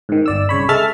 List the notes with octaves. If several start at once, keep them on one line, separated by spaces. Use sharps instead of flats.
G#2 D#3
G1 D5 E6
C2 C#3 C#5 B5
G#3 A4 E5 F6 A6